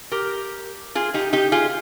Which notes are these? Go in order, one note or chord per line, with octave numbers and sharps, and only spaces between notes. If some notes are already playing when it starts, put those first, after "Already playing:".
G4 A#4
F4 G#4
D#4 G4
D#4 G4
F4 G#4